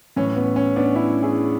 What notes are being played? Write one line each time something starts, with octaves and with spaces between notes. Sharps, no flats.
A2 E3 C#4
B3
C#4
B3 D4
C#4 E4
E4 G#4